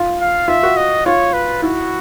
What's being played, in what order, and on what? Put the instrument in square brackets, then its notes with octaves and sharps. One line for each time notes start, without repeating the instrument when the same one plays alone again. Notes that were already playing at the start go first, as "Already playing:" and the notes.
Already playing: [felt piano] F4
[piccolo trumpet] F5
[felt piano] F4 [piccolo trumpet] E5
[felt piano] F#4
[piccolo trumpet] D#5
[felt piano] F4 [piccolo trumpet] C#5
[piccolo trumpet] B4
[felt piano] E4 [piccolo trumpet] F#4